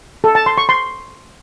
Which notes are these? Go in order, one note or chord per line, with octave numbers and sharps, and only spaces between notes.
A4
A5
C6
C#6
C6